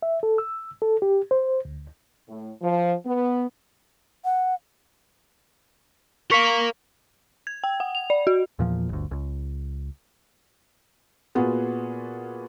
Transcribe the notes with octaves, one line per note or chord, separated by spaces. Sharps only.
E5
A4
E6
A4
G4
C5
D2
A2
F3
B3
F#5
A#4 F5 C#6 B6 C#7
G#6
G5
F#5
F7
D5
F#4
E2 A#2 F3
G1 D2
C#2
A#2 B3 F4 F#4 G#4